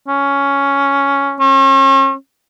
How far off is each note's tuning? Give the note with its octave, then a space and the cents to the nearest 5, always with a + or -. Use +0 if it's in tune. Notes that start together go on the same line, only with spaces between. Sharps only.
C#4 +5
C#4 -40